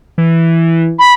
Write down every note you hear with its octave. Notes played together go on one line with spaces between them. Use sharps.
E3
B5